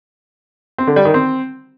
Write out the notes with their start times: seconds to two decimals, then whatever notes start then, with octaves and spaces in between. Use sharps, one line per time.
0.78 C4
0.87 D3
0.96 G3
1.05 D#3
1.14 C4